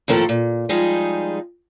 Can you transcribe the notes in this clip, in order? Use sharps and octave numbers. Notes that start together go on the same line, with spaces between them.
D#2 A2 F3 A4 A#4
A#2
F3 G3 G#3 D#4 G#4